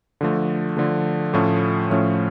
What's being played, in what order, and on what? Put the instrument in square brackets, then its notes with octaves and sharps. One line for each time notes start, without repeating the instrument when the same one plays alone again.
[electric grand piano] D3 F3 A3
D3 F3 A3
A2 F3 A3 C#4
A2 F3 A3 C#4